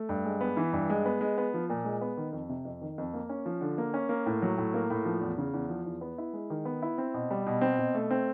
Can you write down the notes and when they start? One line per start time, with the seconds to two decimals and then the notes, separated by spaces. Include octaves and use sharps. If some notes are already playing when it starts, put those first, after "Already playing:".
Already playing: A3
0.09 G2
0.25 G#3
0.41 B3
0.57 E3
0.73 G2
0.90 G#3
1.05 B3
1.21 G#3
1.38 B3
1.54 F3
1.70 A#2
1.85 G#3
2.01 B3
2.17 D#3
2.33 F2
2.49 C3
2.65 F2
2.81 D#3
2.98 F2
3.14 A#3
3.29 C#4
3.46 F3
3.61 D3
3.78 A#3
3.94 C#4
4.09 A#3
4.26 A2
4.42 F#3
4.58 A2
4.74 A#3
4.90 A2
5.05 F3
5.21 E2
5.38 C#3
5.54 E2
5.69 F3
5.86 E2
6.01 B3
6.18 E4
6.33 G#3
6.50 D#3
6.65 B3
6.82 E4
6.98 C4
7.14 B2
7.31 G3
7.46 B2
7.61 C4
7.78 B2
7.95 A3
8.10 C4